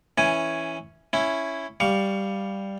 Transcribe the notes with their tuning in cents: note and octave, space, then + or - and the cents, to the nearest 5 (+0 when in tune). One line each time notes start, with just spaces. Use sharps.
E3 +0 C#4 +0 G#5 +5
C#4 +0 E4 +0
G3 +0 F5 +0 C#6 +25